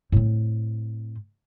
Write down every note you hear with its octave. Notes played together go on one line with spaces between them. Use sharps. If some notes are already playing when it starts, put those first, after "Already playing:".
A2 C4